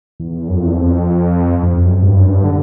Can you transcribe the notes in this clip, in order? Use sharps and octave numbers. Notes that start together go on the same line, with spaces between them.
E2
F#2
F2
E2
F2
F2
F2
F#2
G#2
G2
F#2
G2
D3